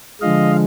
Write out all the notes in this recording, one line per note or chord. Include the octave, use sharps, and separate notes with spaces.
D3 F3 G#3 D#5 F5